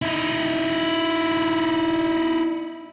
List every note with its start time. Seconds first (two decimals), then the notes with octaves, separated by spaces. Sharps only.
0.02 D#4 E4